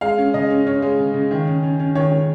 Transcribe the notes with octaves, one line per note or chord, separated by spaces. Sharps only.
G#3 F5
C#4
C#3 D#5
C#4
C#4 C#5
G#3
C#3
C#3
D#3
C#4
C#4
C#4
D#3 C#5
D#3